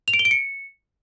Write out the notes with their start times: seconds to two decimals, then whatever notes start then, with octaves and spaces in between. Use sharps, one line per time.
0.08 F7
0.14 D7
0.19 G7
0.25 D7
0.31 C#7